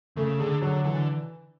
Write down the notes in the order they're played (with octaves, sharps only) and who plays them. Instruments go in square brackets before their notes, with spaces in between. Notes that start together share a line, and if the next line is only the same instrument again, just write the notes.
[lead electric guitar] C#3 [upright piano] A3
[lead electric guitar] D3 [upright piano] G#4
[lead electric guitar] D3 [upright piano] F#3
[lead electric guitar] D3 [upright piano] E3